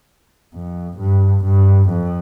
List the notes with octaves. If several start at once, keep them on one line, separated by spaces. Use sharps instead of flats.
F2
G2
G2
F2